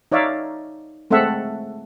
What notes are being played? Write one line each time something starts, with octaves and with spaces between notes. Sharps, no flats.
D#4 C#5 D5 E5 F5
G#3 A3 C4 A4 E5 F#5